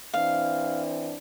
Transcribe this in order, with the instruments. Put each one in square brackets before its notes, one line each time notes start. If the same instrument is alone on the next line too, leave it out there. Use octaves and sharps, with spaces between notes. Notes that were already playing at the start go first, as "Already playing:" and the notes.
[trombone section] E3 C4 D4 [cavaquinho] F5